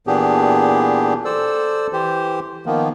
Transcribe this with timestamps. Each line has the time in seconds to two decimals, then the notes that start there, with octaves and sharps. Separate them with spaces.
0.07 A#2 E3 B3 D4 G4 G#4
1.25 A4 C5 D5 E6
1.93 E3 G4 C5
2.66 D#3 F3 A#3 B3